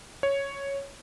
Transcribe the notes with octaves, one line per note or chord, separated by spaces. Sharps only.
C#5